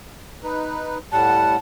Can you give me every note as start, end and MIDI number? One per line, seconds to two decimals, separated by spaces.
0.44 0.98 63
0.44 0.98 71
1.12 1.57 45
1.12 1.57 55
1.12 1.57 78
1.12 1.55 81